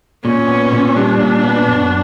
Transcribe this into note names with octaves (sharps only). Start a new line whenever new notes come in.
A#2 C#4
B3
A#2
G3 D4
A#2
B3
F#2